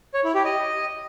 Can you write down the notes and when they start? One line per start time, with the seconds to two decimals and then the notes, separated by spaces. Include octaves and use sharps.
0.14 C#5
0.24 E4
0.34 G4
0.45 D#5